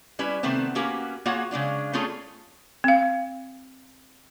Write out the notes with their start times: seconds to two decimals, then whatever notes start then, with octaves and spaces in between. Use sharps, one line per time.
0.19 G3 C#4 E4 B4
0.43 C3 D#3 A3 B3 C4
0.75 A#3 B3 C#4 F#4 G4 A#4
1.26 A#3 F4 F#4 G#4 C#5 F#5
1.51 C#3 G#3 D4 F4
1.93 A3 C#4 E4 F4 G#4 A4
2.84 C4 F5